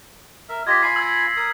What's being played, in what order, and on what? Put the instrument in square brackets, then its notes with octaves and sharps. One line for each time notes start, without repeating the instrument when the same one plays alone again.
[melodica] A#4 E5
[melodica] F4 G4 D#5 [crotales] G#6 A#6 B6
[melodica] F4 G#5 B5 [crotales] C7
[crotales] E6 G#6
[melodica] A#4 D#6